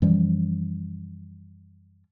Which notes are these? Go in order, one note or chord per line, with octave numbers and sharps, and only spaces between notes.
F#2 E3 F3 G3